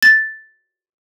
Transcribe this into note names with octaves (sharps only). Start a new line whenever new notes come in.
A6